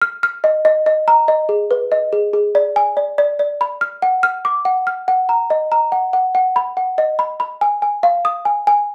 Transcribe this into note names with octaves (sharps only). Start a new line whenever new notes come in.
F6
F6
D#5
D#5
D#5
A#5
D#5
G#4
B4
D#5
G#4
G#4
D5
G#5
D5
D5
D5
B5
F6
F#5
F6
D6
F#5
F6
F#5
A#5
D#5
A#5
F#5
F#5
F#5
B5
F#5
D#5
B5
B5
G#5
G#5
F5
D#6
G#5
G#5